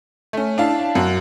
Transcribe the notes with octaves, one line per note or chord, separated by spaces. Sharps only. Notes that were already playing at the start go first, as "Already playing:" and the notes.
A3 C#4
D4 E4 F5 A5
F#2 F#4